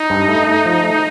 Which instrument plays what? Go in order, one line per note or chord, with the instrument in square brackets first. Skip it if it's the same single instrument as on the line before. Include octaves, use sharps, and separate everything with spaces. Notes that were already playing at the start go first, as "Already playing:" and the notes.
Already playing: [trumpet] D#4
[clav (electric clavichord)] G2
A3
A3
F3
A3